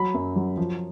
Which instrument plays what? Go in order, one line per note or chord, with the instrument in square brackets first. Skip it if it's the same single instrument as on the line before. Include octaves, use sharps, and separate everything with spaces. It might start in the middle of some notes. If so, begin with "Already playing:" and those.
Already playing: [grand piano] F#3 B5
F#2
F#3
F3